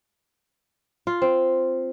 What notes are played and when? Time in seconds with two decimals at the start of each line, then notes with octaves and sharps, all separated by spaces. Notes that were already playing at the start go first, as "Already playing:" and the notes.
1.07 F4
1.22 C4